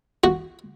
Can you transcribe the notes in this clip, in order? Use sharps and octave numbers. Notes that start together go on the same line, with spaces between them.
F#4